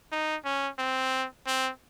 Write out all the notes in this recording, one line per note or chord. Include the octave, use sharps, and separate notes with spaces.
D#4
C#4
C4
C4